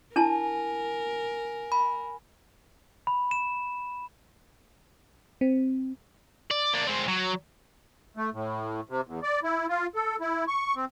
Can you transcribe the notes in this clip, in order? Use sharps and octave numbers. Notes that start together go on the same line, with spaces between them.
D4 E4 A#4 G#5 A5
B5
B5
E7
C4
D5
A#3 D4
G#3 C4
F#3
A3
A2
C3
E2
D5
E4
F4
A4
E4
C#6
C4